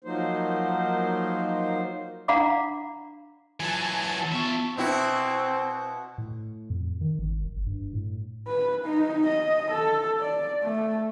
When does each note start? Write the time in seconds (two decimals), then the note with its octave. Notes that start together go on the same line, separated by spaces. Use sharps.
0.04 F3 F#3 A#3 D#4 C5
2.28 D4 F5 F#5 A#5 B5 D6
3.60 E3 F#3 G#5 A5
4.32 B3 F4 E5 A5 C#6
4.77 B2 C4 E4 F#4
6.18 A2
6.70 F2
7.01 D#3
7.19 G#1
7.45 F#1
7.66 G2
7.93 A2
8.47 B4
8.85 D#4
9.28 D#5
9.72 A4
10.20 D5
10.63 A3